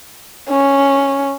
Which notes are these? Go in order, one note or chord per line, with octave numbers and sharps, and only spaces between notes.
C#4